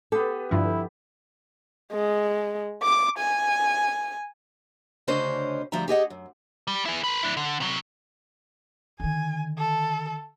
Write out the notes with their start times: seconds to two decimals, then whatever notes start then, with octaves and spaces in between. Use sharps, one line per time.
0.12 B3 G4 A4
0.51 G2 D3 F3 E4
1.93 G#3
2.83 D6
3.19 G#5
5.08 D2 C#3 C#4 D4 C5 D#5
5.72 D2 F3 G3 E5 A#5
5.88 G4 G#4 D#5 F#5
6.10 F#2
6.67 G3
6.86 E4 G#4
7.04 A#4 B4
7.23 D4 E4
7.37 D3
7.60 C3 F#3
9.00 D3 D#3 G#5
9.58 A4